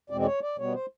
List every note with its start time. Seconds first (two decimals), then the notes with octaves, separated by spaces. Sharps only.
0.10 E2 B2 G#3 C4 D5
0.21 D5
0.25 C#5
0.42 D5
0.58 B2 G3 B3 C#5
0.74 C5